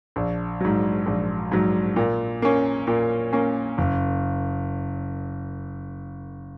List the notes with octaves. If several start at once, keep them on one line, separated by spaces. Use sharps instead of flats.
A#1
G#2 F#3
A#1
G#2 F#3
A#2
A#3 C#4
A#2
A#3 C#4
F#1